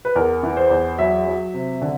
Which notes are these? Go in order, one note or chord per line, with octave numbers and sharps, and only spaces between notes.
B4
E2 A#4
E3
C5
E2
F#3 E5
F#3
C3
D3